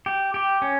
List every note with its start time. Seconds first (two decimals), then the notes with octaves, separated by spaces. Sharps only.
0.06 G4
0.34 G4
0.62 C#4